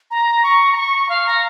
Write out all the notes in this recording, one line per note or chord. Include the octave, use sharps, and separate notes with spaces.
A#5
C#6
A#5
C#6
F5
A#5